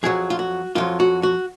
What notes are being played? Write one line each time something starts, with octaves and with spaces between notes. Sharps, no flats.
F2 D#3 F#3 G#4
F4
F#4
F2 D#3 F#3 F4
F#4
F#4